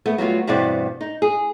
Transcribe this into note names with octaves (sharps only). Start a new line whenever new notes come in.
A3 B3
F#3 G3 B3 F4
E2 G2 B2 C4 D5
D#4
G#4